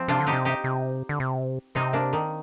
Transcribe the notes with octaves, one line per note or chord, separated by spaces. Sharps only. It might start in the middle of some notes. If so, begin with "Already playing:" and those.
Already playing: F3 C4
C3 D4 F4
D3
D#4 G4
C3
D#4 G4
C3
D3
C3
C3 C4 D#4
A#3 D4
D#3